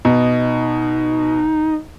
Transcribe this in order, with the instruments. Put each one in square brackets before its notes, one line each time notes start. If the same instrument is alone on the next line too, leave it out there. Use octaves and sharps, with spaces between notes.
[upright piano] B2 [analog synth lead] D#4